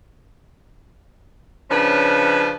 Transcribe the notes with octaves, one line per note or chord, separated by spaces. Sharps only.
C#3 F3 C#4 D4 B4